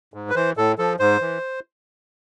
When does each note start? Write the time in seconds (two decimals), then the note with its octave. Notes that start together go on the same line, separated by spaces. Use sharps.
0.14 G#2
0.30 B4
0.35 E3 C5
0.57 A2 A4
0.78 F3 A4
0.99 G#2 C5
1.21 E3